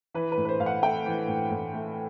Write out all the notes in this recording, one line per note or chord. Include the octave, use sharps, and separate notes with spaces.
E3 B4
B4
A2
B4
C5
A2 F5
F#5
A3 G5
E3
A2
A2
A3